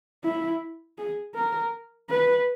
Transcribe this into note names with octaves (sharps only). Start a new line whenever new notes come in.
E4
G#4
A#4
B4